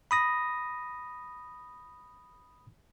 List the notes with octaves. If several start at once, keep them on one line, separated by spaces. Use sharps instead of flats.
B5 D#6 A#6